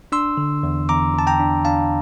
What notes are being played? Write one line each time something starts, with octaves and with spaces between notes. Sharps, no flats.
D4 C6 E6
D3
E2
E2 A#5 D6
E2 A5
G5 A#5
D4
D4 F5 A5